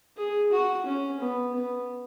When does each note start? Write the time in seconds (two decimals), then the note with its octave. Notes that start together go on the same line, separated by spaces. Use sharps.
0.17 G#4
0.51 F#4
0.86 C#4
1.20 B3
1.54 B3